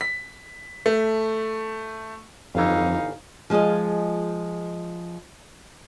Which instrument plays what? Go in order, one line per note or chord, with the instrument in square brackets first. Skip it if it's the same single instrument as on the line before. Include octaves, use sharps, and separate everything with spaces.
[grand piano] B6
A3
[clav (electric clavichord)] G1 E3 [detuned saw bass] F2 [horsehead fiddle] D#4 F5
[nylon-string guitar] F3 G#3 F4 G#4 D#5